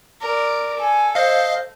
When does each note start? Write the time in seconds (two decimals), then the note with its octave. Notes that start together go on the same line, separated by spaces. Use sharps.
0.21 A#4 D5
0.79 A4 G#5
1.15 C5 D#5 F5